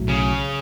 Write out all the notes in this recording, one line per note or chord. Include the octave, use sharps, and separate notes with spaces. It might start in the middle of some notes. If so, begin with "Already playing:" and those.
Already playing: B1 A2 F#3
C#3